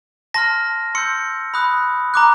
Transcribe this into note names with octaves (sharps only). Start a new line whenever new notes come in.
A5 C6 F6 A#6
C6 E6 G6 C#7
B5 D#6 F#6
A#5 D6 F#6